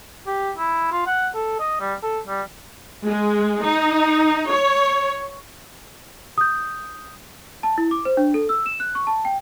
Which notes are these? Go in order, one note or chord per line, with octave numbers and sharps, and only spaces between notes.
G4
E4
F4
F#5
A4
D#5
G3
A4
G3
G#3
D#4
C#5
D#6 G6
A5
E4
D6
C5
D4
A4
E6
E7
F#6
C#6
A5
G5